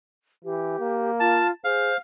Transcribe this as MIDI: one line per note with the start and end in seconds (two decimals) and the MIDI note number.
0.45 0.77 52
0.45 1.11 67
0.79 1.43 58
1.20 1.51 65
1.20 1.47 81
1.64 1.91 68
1.64 1.96 72
1.64 1.97 77